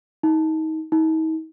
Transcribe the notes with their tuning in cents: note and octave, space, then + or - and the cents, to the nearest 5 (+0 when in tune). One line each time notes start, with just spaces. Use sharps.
D#4 +30
D#4 +40